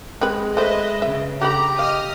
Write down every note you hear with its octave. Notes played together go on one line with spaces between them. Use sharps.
G#3 C4 G4 B4
A3 B4 C5 D#5 E5
C#3 E5
D3 G4 A#5 B5
D#5 F5 D#6 F6